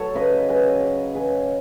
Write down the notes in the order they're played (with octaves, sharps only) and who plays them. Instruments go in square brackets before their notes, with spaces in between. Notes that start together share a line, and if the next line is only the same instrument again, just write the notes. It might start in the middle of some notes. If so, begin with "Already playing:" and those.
Already playing: [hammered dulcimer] F#3 A4 C#5 F#5
C#3 B4 D#5
F#3 G#4 B4
C#3
F#3 G#4 B4